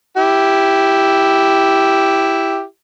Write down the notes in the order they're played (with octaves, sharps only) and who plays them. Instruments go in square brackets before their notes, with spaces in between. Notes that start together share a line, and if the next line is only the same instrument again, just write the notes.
[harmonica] E4 G4